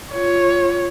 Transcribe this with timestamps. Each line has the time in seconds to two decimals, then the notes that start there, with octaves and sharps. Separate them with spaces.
0.12 F4 C#5